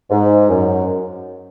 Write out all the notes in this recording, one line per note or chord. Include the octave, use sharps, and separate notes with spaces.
G#2
F#2